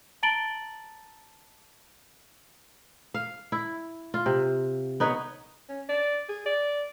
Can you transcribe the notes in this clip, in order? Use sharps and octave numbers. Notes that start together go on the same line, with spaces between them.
A5 A#5 A6 D7 F#7 G7
F5
E4
F4
C3
B3 D#4 B4 C#5
C#4
D5
G#4
D5